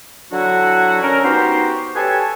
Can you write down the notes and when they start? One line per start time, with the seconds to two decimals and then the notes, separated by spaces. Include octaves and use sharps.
0.32 D3 F#3 D4 E4 F#4
1.03 C#4 A#4
1.25 B3 D#4 F#4 G4 C5
1.96 G4 A4 B4 C#5 G#5 A5